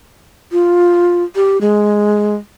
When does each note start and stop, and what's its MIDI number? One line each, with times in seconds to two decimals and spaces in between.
0.52 1.23 65
1.36 1.60 67
1.61 2.35 56